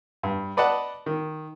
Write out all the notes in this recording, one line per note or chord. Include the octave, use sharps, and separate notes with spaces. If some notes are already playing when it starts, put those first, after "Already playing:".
G2
B4 D5 D#5 F#5 A5
D#3